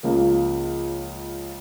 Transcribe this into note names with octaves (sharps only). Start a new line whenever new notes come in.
C#2 C#3 F3 A#3